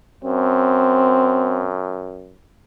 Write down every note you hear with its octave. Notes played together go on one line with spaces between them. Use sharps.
F#2 C4